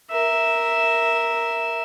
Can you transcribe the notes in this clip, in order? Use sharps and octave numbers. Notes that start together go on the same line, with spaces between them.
A#4 E5